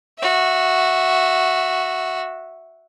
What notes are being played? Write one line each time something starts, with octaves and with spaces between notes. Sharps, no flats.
F#4 E5